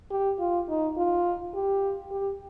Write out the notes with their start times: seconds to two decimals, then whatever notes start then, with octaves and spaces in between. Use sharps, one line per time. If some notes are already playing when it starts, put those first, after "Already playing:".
0.11 G4
0.39 F4
0.69 D#4
0.97 F4
1.55 G4
2.11 G4